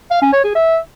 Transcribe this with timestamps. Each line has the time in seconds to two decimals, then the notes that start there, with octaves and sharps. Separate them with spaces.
0.11 F5
0.22 C#4
0.33 C#5
0.44 G#4
0.55 E5